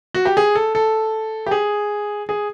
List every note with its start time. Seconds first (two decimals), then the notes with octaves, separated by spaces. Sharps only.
0.14 F#4
0.25 G4
0.37 G#4
0.55 A4
0.75 A4
1.46 G4
1.51 G#4
2.29 G#4